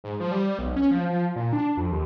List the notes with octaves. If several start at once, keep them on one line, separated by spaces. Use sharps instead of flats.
G#2
F3
G3
B1
C#4
F3
F3
A#2
D4
F2
D#2